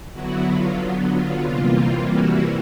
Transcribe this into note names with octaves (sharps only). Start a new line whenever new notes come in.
D3 F#3 B3 E4 F#4
F4
F4
C3 E3 G3 A#3 F4
E4 F#4